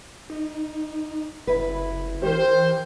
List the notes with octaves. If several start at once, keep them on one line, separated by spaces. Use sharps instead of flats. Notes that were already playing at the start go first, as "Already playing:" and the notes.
D#4
F#1 E4 B4
E3 G4 A#4 C5